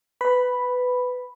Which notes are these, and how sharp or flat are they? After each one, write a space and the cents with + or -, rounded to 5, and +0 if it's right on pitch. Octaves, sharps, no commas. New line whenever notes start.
B4 +15 B5 +0